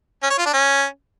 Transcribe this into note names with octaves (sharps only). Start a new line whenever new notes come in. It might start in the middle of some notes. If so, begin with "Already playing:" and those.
C#4
C#5
F4
D4
C#4